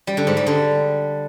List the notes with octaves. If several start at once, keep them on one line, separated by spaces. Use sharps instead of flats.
G3
D3
G#2
G3
D3